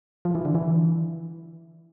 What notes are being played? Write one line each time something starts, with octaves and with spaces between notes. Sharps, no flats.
F3
E3
D3
E3